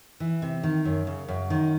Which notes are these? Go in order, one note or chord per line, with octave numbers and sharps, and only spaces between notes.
E3
C3
D#3
F#2
C#3
F#2
D#3